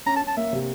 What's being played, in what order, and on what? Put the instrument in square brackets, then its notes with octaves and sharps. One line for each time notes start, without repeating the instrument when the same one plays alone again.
[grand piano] C#4 [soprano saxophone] A#5
[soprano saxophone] A5
[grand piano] C#4
[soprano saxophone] A5
[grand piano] A#3 [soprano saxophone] E5
[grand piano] C3